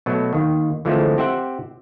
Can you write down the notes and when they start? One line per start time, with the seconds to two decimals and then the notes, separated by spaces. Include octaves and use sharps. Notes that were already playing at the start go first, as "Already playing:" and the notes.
0.06 B2 F#3 A3
0.33 D#2 D#3
0.85 D3 E3 F3 G#3 A3 C4
1.17 C4 G4 C5 E5 F#5 G5